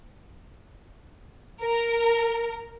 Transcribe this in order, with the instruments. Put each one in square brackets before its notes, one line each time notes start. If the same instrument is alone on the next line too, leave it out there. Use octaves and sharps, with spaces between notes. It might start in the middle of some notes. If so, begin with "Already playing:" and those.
[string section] A#4